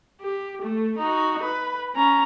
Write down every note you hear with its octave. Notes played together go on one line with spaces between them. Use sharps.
G4
A3
D#4 F#4
B4
C#4 A#5